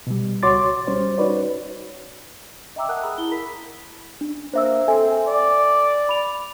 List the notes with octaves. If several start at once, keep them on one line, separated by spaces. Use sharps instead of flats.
B2 G3
C#2 F#4 C#5 C6 D6 A6
G3 C#4 C5
D#4 F#4 B4 C#5 D5
D#5 E5 G5 A#5 D6 E6
A#4 F#5 A5 A#5 D#6 F#6
G#4 A#5 B5 D#6 E6
E4 G7
A#4 B5 B6
D4
A#3 C5 E5 E6
C4 A4 E5 G#5
D5
B5 F7